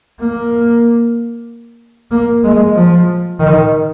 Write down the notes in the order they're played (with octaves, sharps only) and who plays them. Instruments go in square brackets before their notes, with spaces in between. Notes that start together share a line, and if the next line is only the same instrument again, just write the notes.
[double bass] A#3
A#3
G#3
F3
D#3